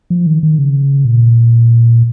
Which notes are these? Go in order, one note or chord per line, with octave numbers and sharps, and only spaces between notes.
F3
D#3
D#3
C#3
A#2